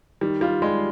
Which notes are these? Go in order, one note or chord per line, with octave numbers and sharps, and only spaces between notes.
D#3 G3
G3 F4
G3 G#3